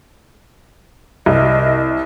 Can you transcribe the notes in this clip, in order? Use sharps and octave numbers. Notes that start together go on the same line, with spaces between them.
C2 D#5